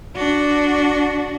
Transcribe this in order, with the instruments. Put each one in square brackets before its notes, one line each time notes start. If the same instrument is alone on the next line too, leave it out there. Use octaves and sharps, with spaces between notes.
[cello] D4 F#4